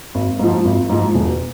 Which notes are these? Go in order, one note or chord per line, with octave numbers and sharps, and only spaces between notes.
G#1
G#2 F3
G#1
G#2 F3
E1